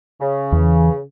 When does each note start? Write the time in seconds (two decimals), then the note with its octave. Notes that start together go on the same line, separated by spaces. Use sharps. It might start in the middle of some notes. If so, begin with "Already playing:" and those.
0.20 C#3
0.52 E2 E3